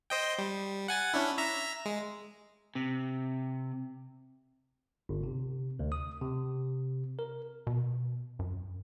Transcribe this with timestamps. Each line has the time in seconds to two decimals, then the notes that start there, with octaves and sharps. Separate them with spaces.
0.10 C5 D#5 G5
0.38 G3
0.88 F#5 G#5 A6
1.14 C#4 D4 E4
1.38 E5 A#5 A#6
1.85 G#3
2.75 C3
5.09 G1
5.24 C3
5.79 D2
5.92 D#6
6.21 C3
7.19 A#4
7.67 B2
8.39 F#2